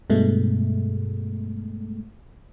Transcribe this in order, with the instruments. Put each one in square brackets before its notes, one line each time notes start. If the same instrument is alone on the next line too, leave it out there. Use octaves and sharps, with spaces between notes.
[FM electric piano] G2 B2 G#3 A3